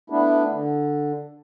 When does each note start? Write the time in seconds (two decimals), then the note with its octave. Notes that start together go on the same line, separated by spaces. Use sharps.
0.10 A3 B3 D4 E4
0.50 D3